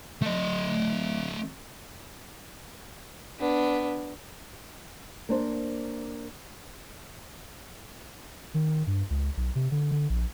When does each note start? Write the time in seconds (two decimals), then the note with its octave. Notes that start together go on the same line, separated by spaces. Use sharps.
0.22 A3 D#5
3.40 B3 D4
5.29 A#3 D4 C5
8.54 D#3
8.87 G2
9.10 C#2
9.37 B1
9.55 C3
9.71 D3
9.91 D3
10.10 A#1